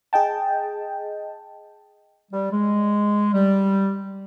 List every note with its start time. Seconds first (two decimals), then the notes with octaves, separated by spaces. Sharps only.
0.13 G#4 D#5 G5 A5
2.32 G3
2.51 G#3
3.33 G3